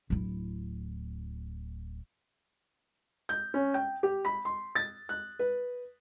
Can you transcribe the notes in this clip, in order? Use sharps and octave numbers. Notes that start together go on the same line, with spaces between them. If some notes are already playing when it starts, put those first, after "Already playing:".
D1 E4
G6
C#4
G5
G4
B5
C6
A6
F#6
B4